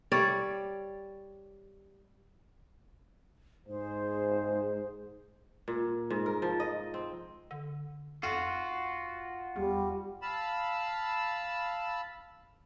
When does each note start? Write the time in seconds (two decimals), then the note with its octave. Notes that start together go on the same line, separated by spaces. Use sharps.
0.12 G3 C#5 D5
3.67 G#2 G#4 C5
5.68 A#2
6.10 G#2
6.26 A#4
6.42 F3
6.60 D#5
6.94 C4
7.51 D3
8.23 F2 F4 F#4
9.56 E2 G3
10.22 F5 A5 B5 E6